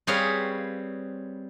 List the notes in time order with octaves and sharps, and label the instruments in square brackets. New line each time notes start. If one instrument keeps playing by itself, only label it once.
[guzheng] G3 C4 G#4 B4 C#5 F5